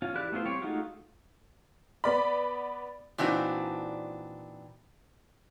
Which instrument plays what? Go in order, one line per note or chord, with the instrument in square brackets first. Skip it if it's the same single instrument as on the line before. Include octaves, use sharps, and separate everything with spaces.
[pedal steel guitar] C#4 F4
E3 E4 G4 D5 F#6
A3 B3 E4 F4 C5
G3 C4 G4 C#5
G#3 A3 D#4 F4 F#4
[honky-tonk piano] B3 D5 B5
[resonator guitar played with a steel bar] A#2 E3 C4 D4 D#4 F#4